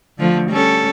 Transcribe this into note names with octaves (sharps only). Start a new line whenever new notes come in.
D3 F3 A3
G3 C#4 A4